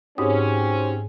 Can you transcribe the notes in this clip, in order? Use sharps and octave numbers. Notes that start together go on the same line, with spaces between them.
G#2 C4 C#4 D#4 F#4 G4 D#6